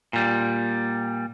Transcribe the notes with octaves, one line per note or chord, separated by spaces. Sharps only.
A#2 G3